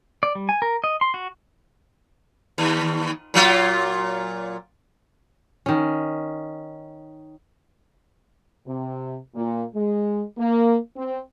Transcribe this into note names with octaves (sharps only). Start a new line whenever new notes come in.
D5
G3
G#5
A#4
D#5
C6
F#4
D#2
A#2 F#3 F4
D#3 C#4
C3
A#2
G#3
A#3
C4